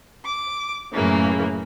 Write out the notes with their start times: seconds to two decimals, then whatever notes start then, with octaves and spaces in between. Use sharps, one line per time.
0.24 D6
0.93 F#2 A2 C#3 E3 A#3